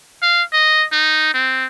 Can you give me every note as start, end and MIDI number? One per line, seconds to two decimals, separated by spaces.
0.23 0.42 77
0.53 0.85 75
0.92 1.34 63
1.34 1.67 60